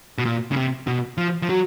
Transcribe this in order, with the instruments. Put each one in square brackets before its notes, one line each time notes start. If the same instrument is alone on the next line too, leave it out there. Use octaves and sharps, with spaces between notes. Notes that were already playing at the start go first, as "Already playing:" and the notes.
[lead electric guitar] B2
A#2
C#3
C3
B2
F3
F3
F#3